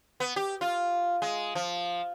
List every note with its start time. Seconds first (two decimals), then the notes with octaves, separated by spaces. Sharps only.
0.20 B3
0.36 G4
0.61 F4
1.22 G#3
1.55 F3